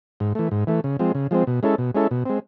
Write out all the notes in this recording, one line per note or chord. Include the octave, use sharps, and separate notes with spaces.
G#2
E3 A3
G#2
E3 A3
C#3
F3 G#3 C4
C#3
F3 G#3 C4
B2
G#3 C#4 E4 A4
B2
G#3 C#4 E4 A4
B2
G#3 C4